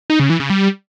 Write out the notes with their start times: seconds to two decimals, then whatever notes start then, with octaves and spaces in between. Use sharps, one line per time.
0.10 D#4
0.20 C#3
0.30 E3
0.40 C#3
0.50 G3